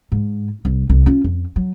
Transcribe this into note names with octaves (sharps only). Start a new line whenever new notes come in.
G#2
C2
C2
C#4 F4
F2
F#3